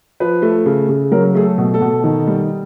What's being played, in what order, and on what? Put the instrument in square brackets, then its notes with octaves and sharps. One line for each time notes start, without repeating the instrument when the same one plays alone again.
[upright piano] F3 B4
A3
C#3
C#3
F#3 A#4
A3 G#4
A4
B2
A4
B2
D#3
G3